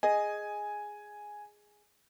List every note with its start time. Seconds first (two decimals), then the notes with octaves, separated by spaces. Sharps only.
0.03 G#4 D#5 G#5